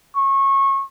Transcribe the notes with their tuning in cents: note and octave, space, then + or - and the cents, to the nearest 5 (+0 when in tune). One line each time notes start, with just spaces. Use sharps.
C#6 -25